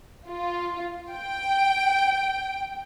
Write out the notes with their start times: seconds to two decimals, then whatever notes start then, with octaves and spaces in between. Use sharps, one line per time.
0.28 F4
1.12 G5